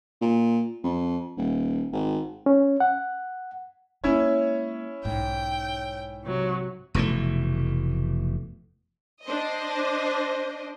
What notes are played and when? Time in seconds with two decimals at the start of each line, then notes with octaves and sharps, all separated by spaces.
0.21 A#2
0.84 F2
1.37 D#1
1.92 G#1
2.46 C#4
2.80 F#5
4.04 G#3 A#3 C#4 E4 C#5
5.05 B1 G#2 G5
6.24 C3 F#3
6.94 F1 B2 E3 A3
9.24 D4 C5 D#5